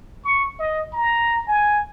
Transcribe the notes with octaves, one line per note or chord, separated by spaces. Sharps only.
C#6
D#5
A#5
G#5